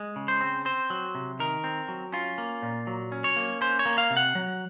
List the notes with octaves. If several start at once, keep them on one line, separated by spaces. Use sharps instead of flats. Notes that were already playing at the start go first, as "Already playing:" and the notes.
Already playing: G#3
C#3
C5
C4
C4 C5
F#3
C3
D#3 A#4
C4
F#3
C#4 F4
A#3
A#2
F#3
C#4
C#5
A#3
C#4 C5
C#5
A#3
F5
C3
F#5
F#3